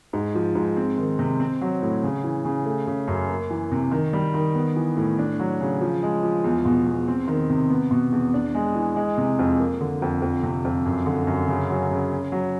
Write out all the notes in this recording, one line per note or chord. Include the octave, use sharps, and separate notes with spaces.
G#2
F3
G#2
C4
D#3
C3
C4
F#3
A2
C#3
E3
C#3
A3
C#3
F#2
A#3
E3
C3
D#3
G3
D#3
B3
E3
A2
D4
F#3
C#3
F3
G#3
F3
E2
B2
E2
C4
D#3
C3
B3
B2
E2
D4
G#3
E3
G#3
C3
F2
A#3
D3
F2
F2
C3
F2
F#2
D3
F#2
C#3
F#3
C#3
C#4
F#3